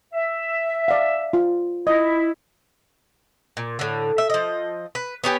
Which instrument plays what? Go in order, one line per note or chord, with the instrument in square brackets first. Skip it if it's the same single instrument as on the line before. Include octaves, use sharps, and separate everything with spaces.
[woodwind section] E5
[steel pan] D5 F5
F4
[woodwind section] E4 [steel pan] D#5
[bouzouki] A#2
A2 D3
E5
F3 D#5
B4
B3 C#4 G4 G#5